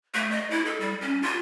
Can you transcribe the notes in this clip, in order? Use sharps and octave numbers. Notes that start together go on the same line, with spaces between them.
A3
D#5
E4
A4
G3
C#4
F4